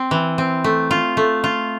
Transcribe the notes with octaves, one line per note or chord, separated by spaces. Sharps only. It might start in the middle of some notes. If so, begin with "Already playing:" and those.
Already playing: C4
E3
C4
A3
F4
A3
F4